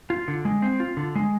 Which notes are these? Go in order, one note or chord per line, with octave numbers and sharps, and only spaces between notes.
F4
D3
G#3
C4
F4
D3
G#3